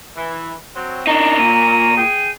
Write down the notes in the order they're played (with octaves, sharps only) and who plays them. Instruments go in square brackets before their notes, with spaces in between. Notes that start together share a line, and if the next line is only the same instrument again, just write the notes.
[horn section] E3
F#3 C4
[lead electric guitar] D4 D#4 [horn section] A#4 C#5 A#5
[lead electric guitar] A#2 [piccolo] D#7
[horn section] G#4 G5